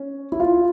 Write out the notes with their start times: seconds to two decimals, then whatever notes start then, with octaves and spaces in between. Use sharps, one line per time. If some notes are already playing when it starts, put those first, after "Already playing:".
Already playing: C#4
0.32 E4
0.40 F4